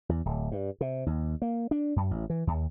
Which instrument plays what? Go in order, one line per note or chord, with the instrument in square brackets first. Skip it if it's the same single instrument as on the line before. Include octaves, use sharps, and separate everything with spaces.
[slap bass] E2
D1
G2
C3
D#2
A#3
D4
F#2
A1
E3
D#2